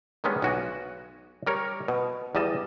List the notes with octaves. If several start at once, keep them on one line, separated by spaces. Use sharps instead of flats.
D#3 G3 G#3 B3 C#4 D4
B1 F#4 G#5
G3 A#4 C#5
B2
E2 G3 D#5 A5